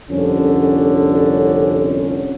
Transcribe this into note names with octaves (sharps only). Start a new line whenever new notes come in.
G1 C2 F2 D3 C#4